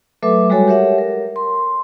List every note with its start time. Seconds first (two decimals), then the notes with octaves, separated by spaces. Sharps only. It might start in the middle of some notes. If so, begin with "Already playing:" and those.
0.23 F#3 A3 A4 B4 E5 D6
0.50 G3 G#3 F#4 A4 C#5 G#5
0.68 G4 A#4 C#5 E5 F#5
0.98 A#4
1.36 C6